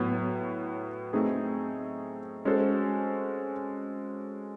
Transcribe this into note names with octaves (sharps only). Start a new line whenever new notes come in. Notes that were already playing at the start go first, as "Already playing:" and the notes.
Already playing: A2 F#3 B3
A3 C4 D#4 G#4
G#3 C#4 F#4 A4 C5